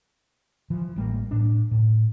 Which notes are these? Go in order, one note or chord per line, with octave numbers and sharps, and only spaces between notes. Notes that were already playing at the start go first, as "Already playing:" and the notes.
E3 F3
A1 G3 A#3
A2 D4
A2